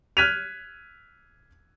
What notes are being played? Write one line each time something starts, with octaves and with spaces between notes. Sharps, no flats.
F6 F#6 G#6 B6 D#7 F7